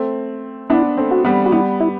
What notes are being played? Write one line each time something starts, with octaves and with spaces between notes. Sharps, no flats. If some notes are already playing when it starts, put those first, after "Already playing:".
Already playing: A3 C4
B3 D4 E4
A3 C4
F#4
G3 B3
F#4
G3 B3 E4
E4